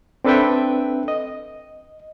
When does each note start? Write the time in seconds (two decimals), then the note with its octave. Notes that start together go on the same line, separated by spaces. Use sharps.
0.25 C4 D4 A4 B4 E5 G5
1.08 D#5